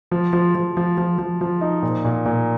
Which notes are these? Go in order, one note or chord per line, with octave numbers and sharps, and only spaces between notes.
F3
F3
F3
F3
F3
F3
F3
D#4
A#2
A#2
A#2